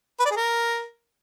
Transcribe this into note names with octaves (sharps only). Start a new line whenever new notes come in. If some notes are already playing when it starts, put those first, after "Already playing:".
B4
D5
G#4
A#4